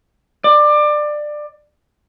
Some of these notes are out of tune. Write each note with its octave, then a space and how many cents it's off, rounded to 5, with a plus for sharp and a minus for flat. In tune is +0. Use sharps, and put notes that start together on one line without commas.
D5 +20